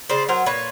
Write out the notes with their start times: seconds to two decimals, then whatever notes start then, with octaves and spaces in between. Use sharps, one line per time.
0.09 C#3 C5 D5
0.29 F#3 A#4 C5
0.46 A#2 B4 C#5